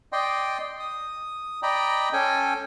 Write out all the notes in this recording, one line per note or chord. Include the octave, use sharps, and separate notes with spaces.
D5 D#5 G5 C6
D#6
D5 D#5 G5 A#5 B5
C#4 A4 G5 G#5